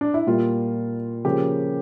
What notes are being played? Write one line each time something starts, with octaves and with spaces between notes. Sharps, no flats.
D4
E4
A#2 G3 A#3 F4
C#3 F3 A#3 G4